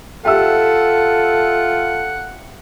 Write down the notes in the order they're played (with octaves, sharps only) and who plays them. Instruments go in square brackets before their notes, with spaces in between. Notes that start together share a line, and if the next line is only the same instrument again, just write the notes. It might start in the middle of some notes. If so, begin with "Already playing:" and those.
[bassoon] F4 [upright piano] G4 E5 E6 [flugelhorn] A4 [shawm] F#5